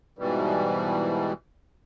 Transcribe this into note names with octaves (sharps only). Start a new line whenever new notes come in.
G#2 B2 E3 G3